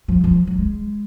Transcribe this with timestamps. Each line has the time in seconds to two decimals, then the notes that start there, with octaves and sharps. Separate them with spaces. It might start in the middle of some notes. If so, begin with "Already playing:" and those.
0.08 F3
0.24 F3
0.47 F#3
0.58 G#3